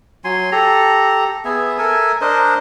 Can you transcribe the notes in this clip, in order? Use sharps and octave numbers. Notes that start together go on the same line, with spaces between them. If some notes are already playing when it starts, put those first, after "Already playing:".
F#3 G#5 C6
G4 A4 A#5
B3 G#4 E5
A4 A#4 E5 G#5
D4 A#4 C5 D#5